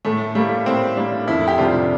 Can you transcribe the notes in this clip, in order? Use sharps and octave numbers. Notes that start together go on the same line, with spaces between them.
A2 A3
G3 A3 A#3
A2 C4
G3 A#3 D4
F2 E4
G4
C3 G3 D4 F4